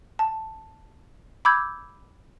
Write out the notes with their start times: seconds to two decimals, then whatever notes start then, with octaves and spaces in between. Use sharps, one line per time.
0.19 A5
1.45 B5 D6 E6 G6 G#6